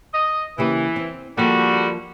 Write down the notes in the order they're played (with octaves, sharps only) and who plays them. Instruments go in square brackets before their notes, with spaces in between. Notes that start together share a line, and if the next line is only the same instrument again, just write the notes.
[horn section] D#5
[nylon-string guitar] C#3 A#3 G4 [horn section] E3
[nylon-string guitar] C4
[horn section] D3 G3 F#4 [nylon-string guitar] F3 A#3